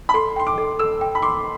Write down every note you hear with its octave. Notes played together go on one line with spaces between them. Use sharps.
B5
A4 C6
G5 C6
D6
A4
A4 E6
G5
B5
C6 D6